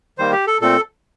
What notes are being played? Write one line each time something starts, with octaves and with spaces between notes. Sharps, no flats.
D#3 G3 A#3 C5
G4
A4
A#2 A3 C4 A4